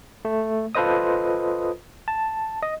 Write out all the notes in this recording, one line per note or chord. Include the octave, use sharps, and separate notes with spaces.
A3
F4 A4 B4 C5 D#5 D#6
A5
D#5